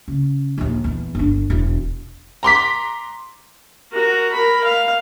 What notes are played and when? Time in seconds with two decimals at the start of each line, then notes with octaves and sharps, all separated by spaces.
0.08 C#3
0.58 A#1 D#2
0.84 E2
1.15 G1 D4
1.50 E1
2.43 A#5 C6 D6 B6
3.92 F#4 A#4
4.32 A#4 B5
4.64 F5